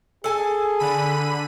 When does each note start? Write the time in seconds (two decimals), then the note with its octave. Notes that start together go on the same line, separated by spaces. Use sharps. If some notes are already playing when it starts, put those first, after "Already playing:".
0.24 G#4 A4 G#5 A5
0.79 D3 B5 D#7